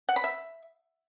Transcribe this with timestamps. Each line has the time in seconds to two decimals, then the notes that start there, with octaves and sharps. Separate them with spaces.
0.09 F#5
0.16 B5
0.24 E5